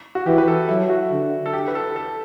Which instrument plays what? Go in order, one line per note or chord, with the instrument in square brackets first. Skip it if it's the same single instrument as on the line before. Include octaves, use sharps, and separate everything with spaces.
[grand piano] F#4
[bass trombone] E3 [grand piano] G4
[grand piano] B4
A4
[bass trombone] F#3 [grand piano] E4
[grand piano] F#4
[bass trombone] D3
[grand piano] A4
G4
B4
A4
A4